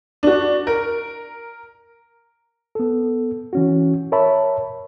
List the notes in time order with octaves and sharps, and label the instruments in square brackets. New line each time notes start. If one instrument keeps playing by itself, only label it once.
[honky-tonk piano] D4 F#4
A#4
[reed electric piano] B3 A4
E3 C#4 F#4
A#4 C#5 E5 A5 B5